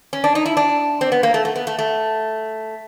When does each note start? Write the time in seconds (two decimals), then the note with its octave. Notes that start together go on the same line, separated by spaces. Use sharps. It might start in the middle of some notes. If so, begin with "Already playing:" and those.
0.13 C#4
0.24 D4
0.35 D#4
0.46 E4
0.57 D4
1.01 C4
1.12 B3
1.23 A#3
1.34 A3
1.45 A3
1.56 B3
1.67 A3
1.79 A3